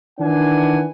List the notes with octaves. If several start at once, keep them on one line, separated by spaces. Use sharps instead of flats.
D#3 E3 D4 F#5 G#5